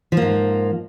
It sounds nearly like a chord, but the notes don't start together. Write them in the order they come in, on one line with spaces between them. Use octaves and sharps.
F3 A#3 G#2